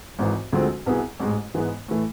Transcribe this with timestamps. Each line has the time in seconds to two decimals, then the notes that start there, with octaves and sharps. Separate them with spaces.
0.19 G#1 G#2 E3
0.53 D2 D3 F3 G#3 C4
0.86 C2 B2 B3 E4 G#4
1.20 A1 G#2 G#3
1.54 G#2 E3 G#3 B3
1.88 A2 E3 A3